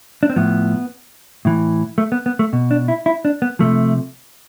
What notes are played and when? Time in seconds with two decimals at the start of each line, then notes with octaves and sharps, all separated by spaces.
0.23 D4
0.30 C4
0.36 A2 F3 B3
1.45 A2 E3
1.98 A3
2.12 B3
2.26 B3
2.39 A3
2.53 B2
2.71 D4
2.88 E4
3.06 E4
3.25 D4
3.42 B3
3.59 C3 F3 A3